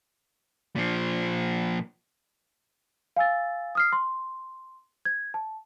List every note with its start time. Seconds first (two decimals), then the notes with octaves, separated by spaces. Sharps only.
0.76 A#2 F3
3.17 F5 G#5 E6 A6
3.75 D#6 F6 C7
3.92 C6
5.05 G#6
5.34 A5